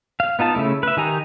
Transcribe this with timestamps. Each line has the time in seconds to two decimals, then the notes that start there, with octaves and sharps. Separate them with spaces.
0.20 F5
0.39 B3 D#4 F4 A5
0.55 C#3 A3 E4
0.83 B4 E5
0.97 D#3 D#4 G4 G#5 A#5